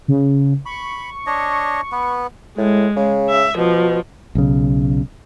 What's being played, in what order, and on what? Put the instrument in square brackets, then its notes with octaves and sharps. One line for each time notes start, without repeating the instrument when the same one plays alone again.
[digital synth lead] C#3
[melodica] B5 [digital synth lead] C#6
[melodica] D4 C#5 D#5
B3 B4
[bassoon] A2 [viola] G#3
[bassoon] C#3
[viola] E5
[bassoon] B2 [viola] F3
[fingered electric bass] B1 C#3